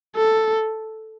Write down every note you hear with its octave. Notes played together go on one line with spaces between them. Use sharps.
A4